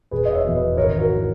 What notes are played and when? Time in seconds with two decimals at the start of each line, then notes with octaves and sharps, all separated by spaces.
0.11 E1 G#4 B4
0.25 D#5
0.33 C#5 E5
0.44 E2 B2
0.55 B4 D#5
0.77 G#1 A#4 C#5
0.99 F#4 A#4
1.15 E3